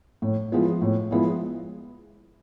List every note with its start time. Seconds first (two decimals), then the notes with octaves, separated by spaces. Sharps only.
0.22 A2
0.52 F3 G#3 B3 E4
0.82 A2
1.11 F3 G#3 B3 E4